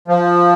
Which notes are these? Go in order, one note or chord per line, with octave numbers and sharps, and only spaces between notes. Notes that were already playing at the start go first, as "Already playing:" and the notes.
F3